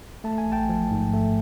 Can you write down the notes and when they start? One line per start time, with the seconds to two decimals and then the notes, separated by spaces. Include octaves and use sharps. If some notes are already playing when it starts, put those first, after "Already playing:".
0.24 A3 A5
0.38 G#5
0.47 A1
0.52 G5 A5
0.69 F3
0.90 G#2
1.13 A3